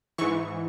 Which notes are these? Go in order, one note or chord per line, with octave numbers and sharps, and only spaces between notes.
G#2 E3 C#6